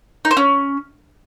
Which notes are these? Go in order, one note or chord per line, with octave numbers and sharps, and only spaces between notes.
D#4
C5
C#4